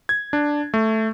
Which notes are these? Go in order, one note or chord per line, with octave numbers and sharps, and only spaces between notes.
G#6
D4
A3